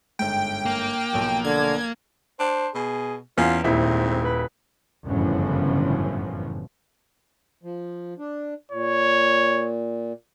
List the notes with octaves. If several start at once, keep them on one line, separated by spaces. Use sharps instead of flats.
G1 G#2 G5
A#3
B1 F3
D3 G#6
D4 C5
B2 G#4
E2 C#4 F4
D#1 G#2 C4 E4
B4
G1 F#2 A2 C#3 E3 F3
F3
D4
A#2 C#5